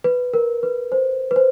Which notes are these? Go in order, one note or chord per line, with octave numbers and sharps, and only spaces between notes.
B4
A#4
B4
C5
B4
C5